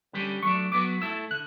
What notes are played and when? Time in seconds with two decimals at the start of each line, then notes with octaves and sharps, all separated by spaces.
0.13 D3 G3 C#4 G4
0.43 F#3 A3 D4 C#6
0.72 F#3 B3 F#4 D6
1.01 A3 E4 A4 E6
1.31 D3 F#6